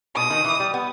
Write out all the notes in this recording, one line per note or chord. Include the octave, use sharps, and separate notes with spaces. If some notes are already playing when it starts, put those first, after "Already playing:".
B2 D#6
D#3
E3
G3
B3